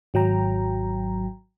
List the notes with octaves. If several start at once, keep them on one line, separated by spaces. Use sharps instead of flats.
G#1 F#3 G5 A#5